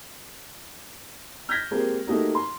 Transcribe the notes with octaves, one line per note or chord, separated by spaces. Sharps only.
F6 G6 G#6 A#6 B6
G#3 A#3 C4 G4 G#4 A#4
A3 A#3 D#4 F#4 G4 A#4
C6